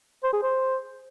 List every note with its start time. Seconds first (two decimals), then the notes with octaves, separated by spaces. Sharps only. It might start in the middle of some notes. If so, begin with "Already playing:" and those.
0.24 C5
0.33 G#4
0.43 C5